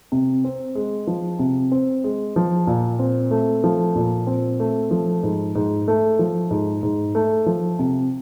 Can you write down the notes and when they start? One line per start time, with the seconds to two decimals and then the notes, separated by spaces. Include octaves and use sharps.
0.12 C3
0.44 C4
0.75 G#3
1.07 F3
1.39 C3
1.71 C4
2.04 G#3
2.36 F3
2.67 A#2
2.99 C4
3.31 A3
3.64 F3
3.96 A#2
4.27 C4
4.60 A3
4.91 F3
5.23 G#2
5.55 G#2
5.88 A3
6.19 F3
6.51 G#2
6.83 G#2
7.15 A3
7.46 F3
7.79 C3